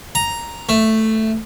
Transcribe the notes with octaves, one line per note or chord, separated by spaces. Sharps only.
A#5
A3